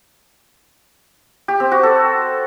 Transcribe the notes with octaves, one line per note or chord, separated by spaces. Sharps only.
G4
C4
F#4
A4